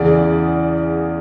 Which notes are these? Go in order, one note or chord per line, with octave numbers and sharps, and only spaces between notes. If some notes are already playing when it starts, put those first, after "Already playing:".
Already playing: E2 C#3 E3 D5